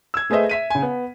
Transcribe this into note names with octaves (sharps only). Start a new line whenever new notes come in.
E6 G#6
A3 G#4 B4 C5 D#5 E5
E5 B6 D#7
C#3 G#5
B3